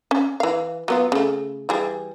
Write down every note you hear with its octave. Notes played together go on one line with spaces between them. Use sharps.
C#4
E3 F5
F#3 B3 F4
C#3 A3
E3 G3 G#4